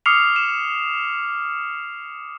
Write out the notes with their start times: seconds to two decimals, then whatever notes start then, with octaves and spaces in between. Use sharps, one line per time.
0.06 D6 D#6 F6 C7 C#7 F7
0.36 E7